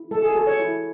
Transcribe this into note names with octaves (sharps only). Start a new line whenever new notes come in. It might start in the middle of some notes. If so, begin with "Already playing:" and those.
Already playing: E4
G#3 A4
G#4
F#4 A4
C#5
E4